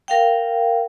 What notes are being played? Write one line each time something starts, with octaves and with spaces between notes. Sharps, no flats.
A#4 F5 G5